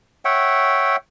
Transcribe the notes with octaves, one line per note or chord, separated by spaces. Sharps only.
C#5 E5 F#5 G5